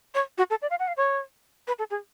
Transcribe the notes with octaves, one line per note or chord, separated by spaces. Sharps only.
C#5
F#4
A4
D5
F5
F#5
F5
C#5
B4
A4
G#4